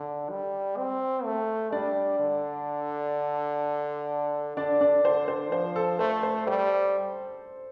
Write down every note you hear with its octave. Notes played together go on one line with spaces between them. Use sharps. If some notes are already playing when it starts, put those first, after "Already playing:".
Already playing: D3
G3
C4
A3
G3 D4 D5
D3
D3 D4 D5
D4 D5
D3 C5
C5
F3 C5
A4
A3 C5
C5
G3 C5